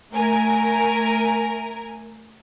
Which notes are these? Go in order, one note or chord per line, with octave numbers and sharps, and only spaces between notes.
A3 A#4 G#5